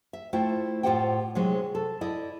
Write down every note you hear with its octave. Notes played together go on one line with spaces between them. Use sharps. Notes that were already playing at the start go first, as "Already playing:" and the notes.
E5
A3 E4 F4 C5 G5
A2 F4 G4 C5 F#5 G5
C3 F#3 G#3 D#4
A4
E4 D5 D#5